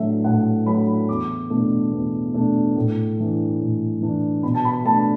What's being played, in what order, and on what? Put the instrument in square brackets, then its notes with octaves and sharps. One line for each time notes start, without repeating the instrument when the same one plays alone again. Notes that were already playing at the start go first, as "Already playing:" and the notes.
Already playing: [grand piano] A2 F#3 A3 D4 E5
A2 F#5
F#3 A3 D4 B5
E2 D6
B2 A3 D4
E2
B2 A3 D4
A2
E3 D4
A2
E3 D4
B2 B5
A5
B5
A3 D4 A5